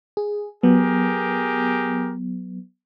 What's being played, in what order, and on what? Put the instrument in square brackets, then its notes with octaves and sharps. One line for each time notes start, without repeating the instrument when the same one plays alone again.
[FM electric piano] G#4
[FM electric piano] F#3 B3 [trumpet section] G4 G#4 A#4